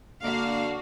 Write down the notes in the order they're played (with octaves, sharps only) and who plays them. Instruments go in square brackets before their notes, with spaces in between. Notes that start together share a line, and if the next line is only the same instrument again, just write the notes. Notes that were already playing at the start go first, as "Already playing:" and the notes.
[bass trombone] D3 [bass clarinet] A#3 [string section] D4 F#4 [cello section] F5